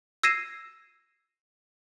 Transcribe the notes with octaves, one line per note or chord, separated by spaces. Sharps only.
E6 G#6 A#6 C7 D#7 E7